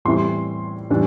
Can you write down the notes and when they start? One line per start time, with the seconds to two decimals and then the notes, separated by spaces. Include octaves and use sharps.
0.05 A2 E3 G3 C4 E4 C6
0.90 A2 E3 G3 D4